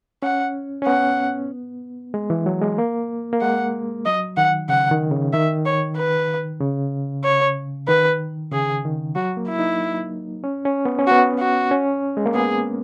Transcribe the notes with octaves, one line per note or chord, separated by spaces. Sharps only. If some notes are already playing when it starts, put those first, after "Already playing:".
C#4 F#5
C#4
B3 F#5
G#3
E3
F#3
G#3
A#3
A#3
G#3 F#5
F#3 D#5
D#3 F#5
C#3 F#5
D#3
C#3
D#3 E5
C#5
B4
C#3
C#5
D#3 B4
C#3 G#4
D#3
F#3 F#4
A#3
E4
D#4
C#4
C#4
B3
C#4
B3 F#4
F#4
C#4
G#3
A#3
B3 G#4